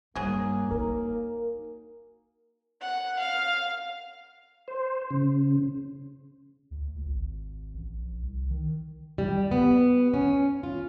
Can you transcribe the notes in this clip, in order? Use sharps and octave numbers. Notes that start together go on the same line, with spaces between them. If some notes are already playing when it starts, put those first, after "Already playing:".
G2 F#3 A#3 G#4
D#4 A#4
F#5
F5
C5
C#3
D2
C#2
G#1
A1
A#1
C2
D#3
G3
B3
C#4
F4